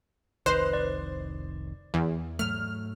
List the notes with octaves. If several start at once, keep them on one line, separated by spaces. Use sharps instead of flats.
F1 C2 D#3 B4 C5 D#5 F#6
D5
E2
G#2 F#3 A3 F6